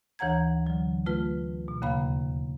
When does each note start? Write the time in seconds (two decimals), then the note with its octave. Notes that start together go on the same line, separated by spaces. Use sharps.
0.19 D2 E3 C#5 F#5 A#5 G#6
0.67 D3 F#3
1.06 A3 F4 B4
1.68 B2
1.82 D#2 C#3 A#3 F5 B5